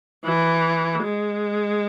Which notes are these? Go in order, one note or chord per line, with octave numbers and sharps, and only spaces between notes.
E3
G#3